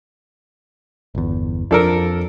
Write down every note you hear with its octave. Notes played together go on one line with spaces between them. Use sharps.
G1 E2
F2 F3 D4 A4 A#4